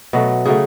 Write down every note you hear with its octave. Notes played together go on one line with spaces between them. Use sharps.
B2 F#3 A3
C#3 F#3 A3 G#4